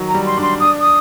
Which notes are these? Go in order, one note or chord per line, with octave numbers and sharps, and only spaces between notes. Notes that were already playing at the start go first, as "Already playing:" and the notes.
Already playing: D#3 F#3
A#5
G3
C6
D4 C6
D4 D#6
D#6